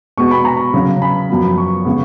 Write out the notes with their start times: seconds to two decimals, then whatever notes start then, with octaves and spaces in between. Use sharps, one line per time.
0.17 B2 G#3 B3 C#6
0.31 B5
0.45 A#5
0.74 C#3 F#3 C#4
1.02 B5
1.29 F#2 F3 B3
1.58 C#6
1.85 C#3 G#3 B3